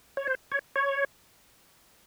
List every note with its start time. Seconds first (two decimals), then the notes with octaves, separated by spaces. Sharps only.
0.17 C#5
0.27 C5
0.52 C#5
0.76 C#5